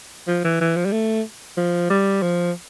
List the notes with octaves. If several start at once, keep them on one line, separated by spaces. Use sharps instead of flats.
F3
E3
E3
F3
G3
A3
F3
G3
F3